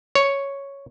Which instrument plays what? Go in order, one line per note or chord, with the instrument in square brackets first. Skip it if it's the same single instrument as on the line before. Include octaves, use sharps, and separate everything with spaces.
[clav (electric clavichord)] C#5